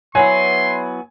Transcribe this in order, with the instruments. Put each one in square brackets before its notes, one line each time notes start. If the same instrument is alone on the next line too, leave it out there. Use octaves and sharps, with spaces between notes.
[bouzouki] F#3 B3 E4 [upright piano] G#5 [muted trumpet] C6